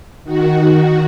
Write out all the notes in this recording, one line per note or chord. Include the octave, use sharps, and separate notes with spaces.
D#3 F#4